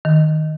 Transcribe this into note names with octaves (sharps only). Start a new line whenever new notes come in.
D#3